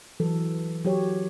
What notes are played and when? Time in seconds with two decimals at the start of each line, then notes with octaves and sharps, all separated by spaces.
0.20 E3 F#3 A4
0.84 F#3 G4 C#5